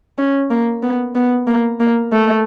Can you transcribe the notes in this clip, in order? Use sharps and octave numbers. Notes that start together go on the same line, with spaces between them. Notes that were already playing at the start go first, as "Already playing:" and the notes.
C#4
A#3
B3
B3
A#3
A#3
A3